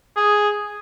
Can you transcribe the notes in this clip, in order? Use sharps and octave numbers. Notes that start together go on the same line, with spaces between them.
G#4